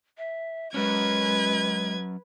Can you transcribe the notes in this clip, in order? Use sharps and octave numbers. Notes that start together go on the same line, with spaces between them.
E5
F#3 G#3 C#4 B4 G#6